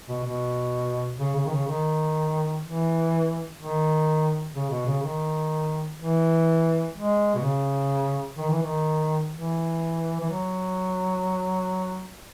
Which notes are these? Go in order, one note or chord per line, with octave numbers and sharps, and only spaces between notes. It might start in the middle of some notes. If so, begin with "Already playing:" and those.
B2
B2
C#3
C#3
D#3
C#3
D#3
E3
D#3
C#3
B2
C#3
D#3
E3
G#3
B2
C#3
D#3
E3
D#3
E3
E3
F#3